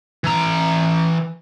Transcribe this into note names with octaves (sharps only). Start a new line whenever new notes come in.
E3 A#5